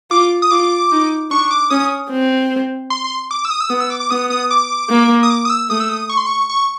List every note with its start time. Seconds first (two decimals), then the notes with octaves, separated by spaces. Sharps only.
0.11 F4 D6
0.42 D#6
0.51 F4 D6
0.92 D#4
1.31 D4 C#6
1.51 D6
1.70 C#4 D#6
2.11 C4
2.90 C6
3.04 C6
3.31 D6
3.45 E6
3.50 D#6
3.61 E6
3.70 B3 D#6
3.80 E6
3.90 D6
4.00 D6
4.11 B3 D#6
4.30 D#6
4.51 D6
4.90 A#3
5.23 D#6
5.30 D6
5.45 D#6
5.50 E6
5.70 A3 D#6
5.80 E6
5.89 D#6
6.09 C#6
6.17 C6
6.26 C#6
6.50 C#6